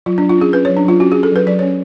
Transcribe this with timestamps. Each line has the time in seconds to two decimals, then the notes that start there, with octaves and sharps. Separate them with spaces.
0.06 F#3 F4
0.18 D4
0.22 F#3
0.29 F4
0.38 C#4 G#4
0.53 C#4 B4
0.65 C#5
0.69 F#3
0.77 D4
0.84 F#3 F4
1.00 C#4 F#4
1.12 G#4
1.16 C#4
1.23 A4
1.31 F#3 B4
1.47 F#3 D5
1.59 C#5
1.62 C#4